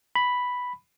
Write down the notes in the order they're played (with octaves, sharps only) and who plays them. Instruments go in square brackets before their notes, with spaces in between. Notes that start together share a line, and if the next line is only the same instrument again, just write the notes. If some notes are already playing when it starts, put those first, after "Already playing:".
[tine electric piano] B5